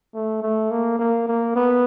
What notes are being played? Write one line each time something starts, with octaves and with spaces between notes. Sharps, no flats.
A3
A3
A#3
A#3
A#3
B3